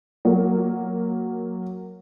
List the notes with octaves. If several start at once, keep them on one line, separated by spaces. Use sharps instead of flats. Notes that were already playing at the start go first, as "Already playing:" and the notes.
F#3 A#3